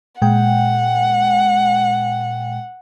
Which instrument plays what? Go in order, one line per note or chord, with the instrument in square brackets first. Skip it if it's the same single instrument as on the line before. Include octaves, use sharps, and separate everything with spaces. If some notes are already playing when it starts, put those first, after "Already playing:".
[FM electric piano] A#2 G#3 G5 [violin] F#5